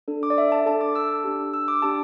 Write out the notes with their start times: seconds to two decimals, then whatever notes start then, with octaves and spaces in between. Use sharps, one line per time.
0.08 D4 A4
0.23 D6
0.30 D5
0.38 E5
0.52 A5
0.66 D4 A4 A5
0.81 D6
0.95 E6
1.24 D4 G4
1.54 E6
1.68 D6
1.82 D4 G4 A5